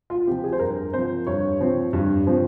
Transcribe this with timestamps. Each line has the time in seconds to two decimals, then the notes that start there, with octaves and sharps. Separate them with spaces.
0.10 F4
0.27 F3 C4 G4
0.44 G#4
0.53 C5
0.59 G2 A#4
0.93 F3 C4 C5
1.27 G2 C#5
1.60 F3 C4
1.93 G2
2.27 F3 C4